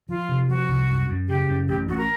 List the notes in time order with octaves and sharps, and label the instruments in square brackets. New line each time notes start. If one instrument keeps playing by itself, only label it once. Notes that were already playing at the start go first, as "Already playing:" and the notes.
[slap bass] F3 [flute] F4
[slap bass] C3
[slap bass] F3 [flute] F#4
[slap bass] C2
F#2
F#2
[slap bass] C#3 [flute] G4
[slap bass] F#2
[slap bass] A1 [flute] G4
[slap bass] A1 [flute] F#4
[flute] A#4